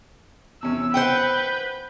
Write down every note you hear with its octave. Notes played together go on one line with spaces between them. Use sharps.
E2 C3 C#4 E6
B4 C5 F#5 G5 G6